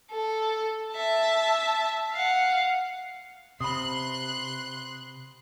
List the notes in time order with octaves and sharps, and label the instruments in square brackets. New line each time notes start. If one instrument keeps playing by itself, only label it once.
[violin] A4
E5 A5
F5 F#5
[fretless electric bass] C3 [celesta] B5 D#6 [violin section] C6 F#6